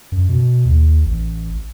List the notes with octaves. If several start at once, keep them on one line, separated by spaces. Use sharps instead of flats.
F#2
B2
D#2
A1